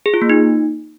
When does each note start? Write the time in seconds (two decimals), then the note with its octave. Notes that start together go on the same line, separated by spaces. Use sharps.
0.06 G#4
0.14 F4
0.22 A#3
0.30 D#4